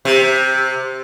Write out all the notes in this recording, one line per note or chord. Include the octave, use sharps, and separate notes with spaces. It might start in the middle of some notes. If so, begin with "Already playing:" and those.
C3